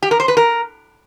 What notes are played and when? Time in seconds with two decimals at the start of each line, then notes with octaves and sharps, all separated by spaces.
0.02 G4
0.11 A#4
0.20 C5
0.28 B4
0.37 A#4